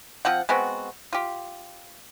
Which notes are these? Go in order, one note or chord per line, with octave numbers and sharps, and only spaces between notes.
F3 C4 F#5
G#3 B3 C4 F#4
F4 G4